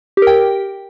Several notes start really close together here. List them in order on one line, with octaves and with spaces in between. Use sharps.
G4 A#4 G5